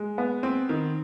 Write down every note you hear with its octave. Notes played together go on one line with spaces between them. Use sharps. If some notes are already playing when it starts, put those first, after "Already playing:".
Already playing: G#3
B3
C4
D#3